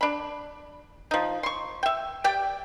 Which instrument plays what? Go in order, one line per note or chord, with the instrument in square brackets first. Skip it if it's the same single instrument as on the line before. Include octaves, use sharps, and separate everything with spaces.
[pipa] D4 B5
F3 D#4
C6 C#6
E5 G5
G4 D5 G5